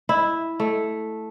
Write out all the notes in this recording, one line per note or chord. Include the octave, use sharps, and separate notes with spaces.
E4
A3